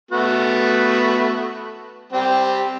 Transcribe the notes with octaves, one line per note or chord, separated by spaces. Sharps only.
A3 B3 F#4
G3 C4 G4